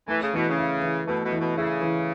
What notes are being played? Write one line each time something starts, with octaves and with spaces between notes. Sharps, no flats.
E3 A3
C#3
B2 E3
C#3
E4
E3
B2 A3
B2
E3
B2
C#3 E4
E3